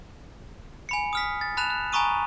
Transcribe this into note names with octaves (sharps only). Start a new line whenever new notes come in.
G#5 B5 C#7
D#6 F6 B6
A6
A5 B5 F#6 E7 F7
F#6
G#5 A#5 B5 C#6 D#6 D#7